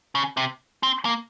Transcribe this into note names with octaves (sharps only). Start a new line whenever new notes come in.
C#3
C3
C4
A#3